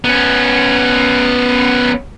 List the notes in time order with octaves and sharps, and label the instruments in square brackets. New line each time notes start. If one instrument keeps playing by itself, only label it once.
[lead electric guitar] B3 C#4